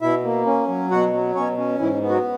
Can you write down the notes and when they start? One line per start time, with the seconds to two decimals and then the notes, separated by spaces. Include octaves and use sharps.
0.01 B2 E4 E5
0.24 A#3
0.46 C#4
0.68 F#3
0.91 B2 F#4 F#5
1.13 F#3
1.35 B2 C#4 C#5
1.58 C#4
1.79 G#2 E3 E4
2.02 B3
2.09 F#3 F#4